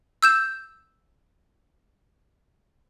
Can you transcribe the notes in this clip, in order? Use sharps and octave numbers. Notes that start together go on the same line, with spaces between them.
E6 G6 E7